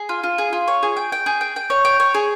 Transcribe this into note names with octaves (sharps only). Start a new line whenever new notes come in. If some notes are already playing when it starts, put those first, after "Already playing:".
Already playing: G#4
F4
F4
G#4
F4
C#5
G#4
G5
G5
G#4
G5
G5
C#5
G5
C#5
G#4